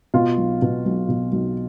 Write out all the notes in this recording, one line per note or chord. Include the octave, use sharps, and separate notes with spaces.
B2 F4 F5
B1
B2
B1
B2
B1